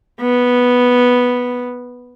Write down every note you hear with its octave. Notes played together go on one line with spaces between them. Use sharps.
B3